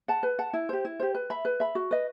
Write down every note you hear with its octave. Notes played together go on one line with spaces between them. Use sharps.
F#5 A5
B4
F#5 A5
E4
G4 C5
E4
G4 C5
B4
E5 B5
B4
E5 B5
F#4
B4 D#5